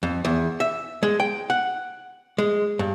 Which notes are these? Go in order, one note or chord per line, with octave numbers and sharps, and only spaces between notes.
F2
E2
E5
G#3
G5
F#5
G#3
G2